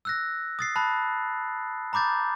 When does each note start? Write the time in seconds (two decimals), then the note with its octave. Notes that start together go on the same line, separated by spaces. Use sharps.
0.05 E6 F#6 A#6
0.59 D#6 A6 C7
0.76 A5 B5 F#6
1.93 A#5 B5 D6 G6 A6